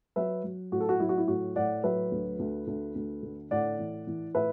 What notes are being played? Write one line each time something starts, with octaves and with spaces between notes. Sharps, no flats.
F#3 B4 E5
F#3
A2 F#4
A4
F#4
F#3 E4
F#4
E4
A2 F#4
A2 D5 F#5
F#3 B4 E5
D2
D2
D2
D2
D3
A2 D5 F#5
E3
E3
A2 B4 E5